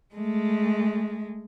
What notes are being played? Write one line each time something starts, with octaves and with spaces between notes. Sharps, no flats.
G#3 A3